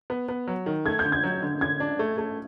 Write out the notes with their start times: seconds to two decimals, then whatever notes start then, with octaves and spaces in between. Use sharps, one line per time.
0.10 B3
0.28 B3
0.48 F#3
0.66 D#3
0.86 A3 G#6
0.99 G6
1.05 D3
1.12 G#6
1.24 F#3
1.42 D3
1.61 D3 G#6
1.80 D4
1.99 A3
2.18 A3